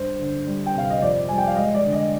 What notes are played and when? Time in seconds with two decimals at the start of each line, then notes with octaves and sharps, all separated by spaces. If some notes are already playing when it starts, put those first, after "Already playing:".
Already playing: G2 C5
0.19 D3
0.47 G3
0.66 G5
0.75 C3 F5
0.90 D#5
1.02 F2 D5
1.29 G3 G#5
1.38 G5
1.47 F5
1.56 G#3 D#5
1.74 D5
1.84 D3
1.93 D#5